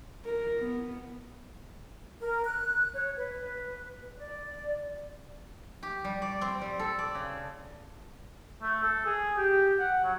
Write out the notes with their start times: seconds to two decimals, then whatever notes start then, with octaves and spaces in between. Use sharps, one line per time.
0.25 A#4
0.59 B3
2.21 A#4
2.46 F#6
2.94 C#5
3.17 B4
4.18 D5
5.83 G4
6.04 G3
6.22 D5
6.41 C4
6.61 G3
6.79 A4
6.99 D5
7.15 C#3
8.62 A3
8.83 A4
9.06 G#4
9.37 G4
9.79 F#5
10.04 F#3